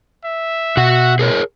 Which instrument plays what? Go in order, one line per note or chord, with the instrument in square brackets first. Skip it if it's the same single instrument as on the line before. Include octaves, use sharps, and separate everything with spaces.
[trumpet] E5
[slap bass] B2 [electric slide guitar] F#4 F#5
[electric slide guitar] G#4 A#4 C#5